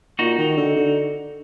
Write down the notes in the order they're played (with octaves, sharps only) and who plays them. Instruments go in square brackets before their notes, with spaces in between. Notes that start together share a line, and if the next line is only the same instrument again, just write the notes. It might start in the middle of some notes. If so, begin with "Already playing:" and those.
[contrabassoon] A#2 [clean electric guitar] D#4 F#4
[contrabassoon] D#3
D3
D3